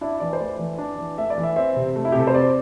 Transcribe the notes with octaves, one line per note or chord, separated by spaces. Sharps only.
D4 E4
E3 D5
C5
A3 D5
E3
D4
E3
A3 E5
D5
E3
E5
C4 E5
C3
A3
E4
G4
C3 A4
C5
C4 D5